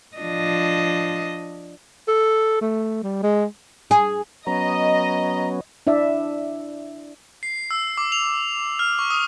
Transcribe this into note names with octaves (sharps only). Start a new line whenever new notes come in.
F3 D4 D#5
A4
A3
G3
G#3
G#4
F#3 B3 C#4 D#5 A#5
D4 E4 D5 E5
C7
E6
D6
F7
F6
C#6
D#6